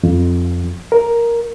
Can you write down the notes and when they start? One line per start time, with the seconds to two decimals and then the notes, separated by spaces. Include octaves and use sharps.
0.03 F2
0.92 A#4